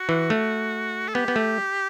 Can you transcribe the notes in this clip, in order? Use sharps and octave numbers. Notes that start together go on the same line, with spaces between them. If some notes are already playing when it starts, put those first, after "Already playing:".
Already playing: F#4
E3
A3
A4
B3 G4
B3
A3